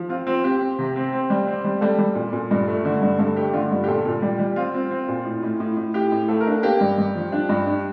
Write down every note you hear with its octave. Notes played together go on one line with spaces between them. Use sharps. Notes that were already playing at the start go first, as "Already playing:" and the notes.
Already playing: F3
C4 F4
C4
C4 G4
C4
C3
C4
C4
G3
C4
G3
G3 A4
G3
A#2
A#2
G2
A3
D3
G2
G2 A4
A3 G4
D3 F4
G2
G4
A#2 A4
A#2
G3 G4
G3
C4 F4
C4
C4
A#2
A2
A2
A2
A2
A2 G4
A2
A3 A4
A#4
D4 A4
A#3 G4
G2
G2
F3
D4
G2
D4